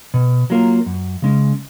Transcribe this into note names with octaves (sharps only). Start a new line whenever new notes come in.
B2
F#3 A#3 F4 A#4
F#2
C#3 G#3 C#4